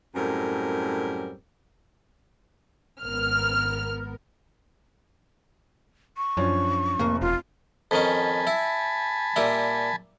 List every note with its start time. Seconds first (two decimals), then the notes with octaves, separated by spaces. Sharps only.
0.15 F#2 A2 G3 C4 A#4
3.03 G#1 B3 A#4 F6
6.17 C#6
6.37 F#2 F3 C#4 D4
6.99 F1 A#3
7.22 E1 F4
7.91 F2 D#3 C#4 G#5 A5 B5
8.47 E4
9.36 A#2 G3 E4